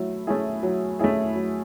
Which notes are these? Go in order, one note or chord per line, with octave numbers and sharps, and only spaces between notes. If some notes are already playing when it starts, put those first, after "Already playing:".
Already playing: F#3 A3 E4
A3 C#4 E4 G#4
F#3
A3 C#4 E4 G#4
F#3